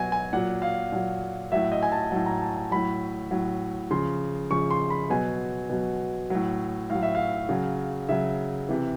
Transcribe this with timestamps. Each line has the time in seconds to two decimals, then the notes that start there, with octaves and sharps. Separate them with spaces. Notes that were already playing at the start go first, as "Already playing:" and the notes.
Already playing: B2 F#3 G#5
0.12 G#5
0.33 A#2 F#3 F#5
0.62 F5
0.92 A#2 F#3
1.52 A2 F#3 E5
1.72 D#5
1.83 G#5
1.92 A5
2.12 A2 F#3 A5
2.26 A#5
2.41 A5
2.57 A5
2.71 A2 F#3 B5
3.31 A2 F#3
3.91 C#3 F3 C6
4.50 C#3 F3 C#6
4.71 C6
4.90 B5
5.10 B2 F#3 G#5
5.70 B2 F#3
6.30 A2 F#3
6.90 A2 F#3 F5
7.02 E5
7.15 F5
7.49 C#3 F#3
8.09 C#3 F#3 E5
8.69 C3 E3